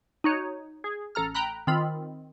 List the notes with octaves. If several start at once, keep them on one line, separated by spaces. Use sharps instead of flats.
D#4 F#4 C#5
G#4
A1 A4 A#5 F6
G5 A#5 B5 F#6
D#3 C4 F4 B5